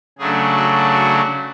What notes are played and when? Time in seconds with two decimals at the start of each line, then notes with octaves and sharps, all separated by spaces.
0.18 C#3 F#3 A3 D4 G#4
0.55 F#4
0.91 F#4